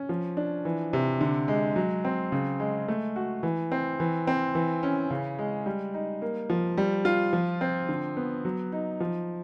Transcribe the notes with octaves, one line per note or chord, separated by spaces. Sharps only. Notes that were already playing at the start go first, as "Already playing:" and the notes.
Already playing: C#4
F3
D4
E3
C3
D3
G#3
F#3
C4
C#3
G#3
A3
F#4
E3
C4
E3
C4
E3
C#4
C#3
G#3
G3
D#4
A#3
F3
G3
F4
F3
C4
D3
B3
F#3
D#4
F3